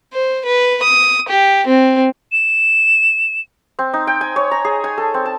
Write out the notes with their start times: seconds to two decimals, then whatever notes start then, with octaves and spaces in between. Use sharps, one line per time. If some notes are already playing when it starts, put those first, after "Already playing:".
0.13 C5
0.45 B4
0.83 D#6
1.29 G4
1.67 C4
2.32 E7
3.79 C4
3.94 D#4
4.07 G5
4.21 G#5
4.36 C#5
4.51 A#5
4.65 G#4
4.84 G#5
4.98 A4
5.14 C4
5.25 A5